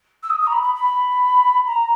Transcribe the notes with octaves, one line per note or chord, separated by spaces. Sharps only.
E6
D#6
D#6
A#5
B5
B5
B5
A#5